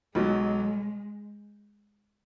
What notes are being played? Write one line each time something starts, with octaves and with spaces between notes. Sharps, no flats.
B1 B2 F#3 G#3